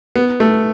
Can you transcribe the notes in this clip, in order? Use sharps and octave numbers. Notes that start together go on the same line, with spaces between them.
B3
A3